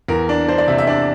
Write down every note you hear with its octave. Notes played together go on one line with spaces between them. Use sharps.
E2 A#4
D4
D4 C5
D5
C3 E5
E5
D4 D5